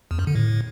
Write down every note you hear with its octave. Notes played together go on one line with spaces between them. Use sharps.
E2
F#2
D3
A2